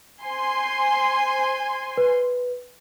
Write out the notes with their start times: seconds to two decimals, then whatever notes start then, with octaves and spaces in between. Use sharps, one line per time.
0.23 C5 G#5 C6
1.97 B4